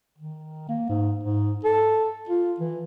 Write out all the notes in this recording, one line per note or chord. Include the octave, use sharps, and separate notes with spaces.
D#3
A#3
G#2
G#2
A4
F4
E3